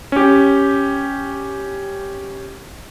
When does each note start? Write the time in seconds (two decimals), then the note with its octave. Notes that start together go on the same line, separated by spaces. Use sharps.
0.12 C#4 G4